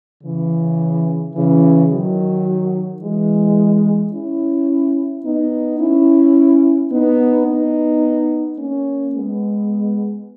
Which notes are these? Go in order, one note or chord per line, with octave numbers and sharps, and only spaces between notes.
C#3 E3
C#3 E3
D#3 F#3
E3 G#3
C#4 E4
B3 D#4
C#4 E4
B3 D#4
B3 D#4
A#3 C#4
G#3 B3